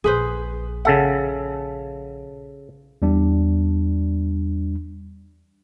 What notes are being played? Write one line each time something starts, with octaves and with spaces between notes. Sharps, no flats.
A#1 G#4 B4 C5
C#3 A4 E5 F#5
E2 G3 D4